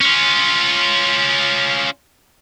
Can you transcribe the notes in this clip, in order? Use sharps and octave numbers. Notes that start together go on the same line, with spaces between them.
C#4 F4